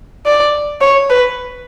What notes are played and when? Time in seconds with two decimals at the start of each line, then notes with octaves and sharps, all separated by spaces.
0.26 D5
0.81 C#5
1.10 B4